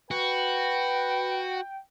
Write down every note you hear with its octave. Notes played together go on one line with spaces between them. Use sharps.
F#4 B4 G5